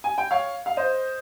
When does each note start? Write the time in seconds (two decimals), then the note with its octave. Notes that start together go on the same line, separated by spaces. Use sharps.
0.04 G#5
0.18 G5
0.31 C#5 F5
0.66 F5
0.77 C5 D#5